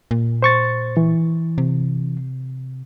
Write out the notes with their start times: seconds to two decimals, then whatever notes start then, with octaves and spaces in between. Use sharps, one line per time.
0.11 A#2
0.42 C5 C#6 A6
0.97 E3
1.58 C3